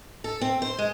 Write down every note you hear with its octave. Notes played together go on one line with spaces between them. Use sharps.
A4
C4
C5
G#3